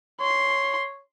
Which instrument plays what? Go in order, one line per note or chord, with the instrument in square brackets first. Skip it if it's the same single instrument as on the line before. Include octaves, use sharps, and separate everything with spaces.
[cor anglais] C#5 [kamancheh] C6